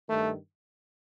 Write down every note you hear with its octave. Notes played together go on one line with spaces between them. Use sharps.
G2 D#3 A3